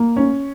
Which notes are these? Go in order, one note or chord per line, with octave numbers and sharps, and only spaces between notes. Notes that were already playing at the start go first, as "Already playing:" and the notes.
Already playing: A#3
C#4